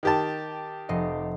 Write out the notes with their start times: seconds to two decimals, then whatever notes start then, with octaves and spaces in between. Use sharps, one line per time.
0.03 D#3 G4 A5
0.89 F1 D#5 C7